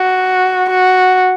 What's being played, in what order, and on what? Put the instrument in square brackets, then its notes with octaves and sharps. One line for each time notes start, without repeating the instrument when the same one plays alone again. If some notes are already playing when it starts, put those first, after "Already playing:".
Already playing: [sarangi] F#4
F#4